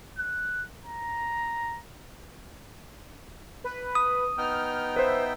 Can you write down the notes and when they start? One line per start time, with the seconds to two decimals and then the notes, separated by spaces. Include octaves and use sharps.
0.18 F#6
0.84 A#5
3.64 B4
3.95 D#6
4.38 B3 D#4 G5 F6
4.96 B4 C5 E5